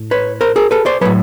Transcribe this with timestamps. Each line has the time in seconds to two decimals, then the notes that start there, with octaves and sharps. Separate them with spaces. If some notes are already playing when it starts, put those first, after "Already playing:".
Already playing: A2
0.11 B4 C#5
0.41 A#4 C5
0.56 G#4 A#4
0.71 A4 B4
0.86 C5 D5
1.01 A2 F#3 B4 C#5